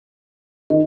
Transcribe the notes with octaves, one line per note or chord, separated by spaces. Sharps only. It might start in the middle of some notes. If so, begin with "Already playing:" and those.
D#3 D#5